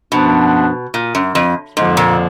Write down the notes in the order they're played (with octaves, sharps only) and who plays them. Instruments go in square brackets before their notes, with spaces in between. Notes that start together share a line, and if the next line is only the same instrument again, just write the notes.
[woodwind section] F#2 F3 B3 D4 [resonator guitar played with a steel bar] B2
[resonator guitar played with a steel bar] A#2
F#2
F2
[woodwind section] F2 D3 F3 A#3 F4 [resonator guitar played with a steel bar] G#2
[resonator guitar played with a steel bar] A#2